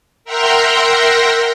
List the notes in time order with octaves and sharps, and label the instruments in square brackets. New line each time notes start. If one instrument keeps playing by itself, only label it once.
[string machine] A#4 E5 F#5 G5 A#5 C6